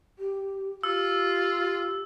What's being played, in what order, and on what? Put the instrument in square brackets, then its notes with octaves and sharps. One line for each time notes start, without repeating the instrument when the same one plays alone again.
[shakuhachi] G4
[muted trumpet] F4 [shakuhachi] G4 [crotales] E6